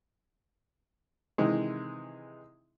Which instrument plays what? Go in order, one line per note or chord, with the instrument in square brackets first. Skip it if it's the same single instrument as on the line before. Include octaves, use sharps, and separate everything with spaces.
[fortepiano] C3 D#3 E3 G#3